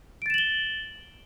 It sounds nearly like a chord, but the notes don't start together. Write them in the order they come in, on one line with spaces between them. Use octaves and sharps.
D7 A6 E7 F#7 G7